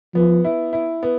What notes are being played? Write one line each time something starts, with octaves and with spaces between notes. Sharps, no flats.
F3 B3
E4
E4
B3